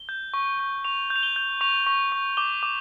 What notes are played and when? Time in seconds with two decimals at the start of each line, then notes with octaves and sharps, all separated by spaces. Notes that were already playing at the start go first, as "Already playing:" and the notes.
Already playing: G7
0.09 G6
0.34 C#6
0.59 C#6
0.84 C#6 F7
1.10 G6
1.16 F7
1.23 G7
1.36 G6
1.61 C#6 F7
1.86 C#6
2.12 C#6
2.37 D6 G7
2.63 D6